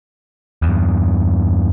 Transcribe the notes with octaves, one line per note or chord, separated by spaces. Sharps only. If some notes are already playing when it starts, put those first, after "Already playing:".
E2 G2